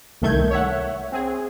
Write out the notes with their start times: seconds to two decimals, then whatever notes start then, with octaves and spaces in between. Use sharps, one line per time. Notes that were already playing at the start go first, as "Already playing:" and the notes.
0.22 C2 D#3 A3 G6 G#6
0.51 C#5 E5 F#5
1.12 C4 G#4